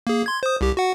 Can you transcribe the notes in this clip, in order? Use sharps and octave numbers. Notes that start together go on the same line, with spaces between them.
A#3 G#4
C6 G#6
C5 D#6
C2 G4
F#4 F#5